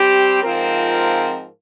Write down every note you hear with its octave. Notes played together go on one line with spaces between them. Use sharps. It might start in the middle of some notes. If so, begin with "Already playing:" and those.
Already playing: G3 C4 G4
G#2 F3 C4 F4 A#4